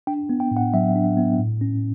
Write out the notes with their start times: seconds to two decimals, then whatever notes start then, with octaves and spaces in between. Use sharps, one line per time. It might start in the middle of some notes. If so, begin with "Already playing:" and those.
0.07 D4 G5
0.29 B3
0.40 G5
0.51 A2
0.57 F#5
0.74 F#3 E5
0.95 D4
1.17 B3
1.39 A2
1.61 C#4